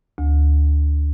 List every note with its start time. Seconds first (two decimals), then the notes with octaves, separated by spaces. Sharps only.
0.18 D2